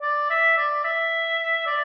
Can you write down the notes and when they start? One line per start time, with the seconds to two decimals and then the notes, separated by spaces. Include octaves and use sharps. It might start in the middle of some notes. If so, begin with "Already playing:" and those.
0.02 D5
0.30 E5
0.57 D5
0.84 E5
1.67 D5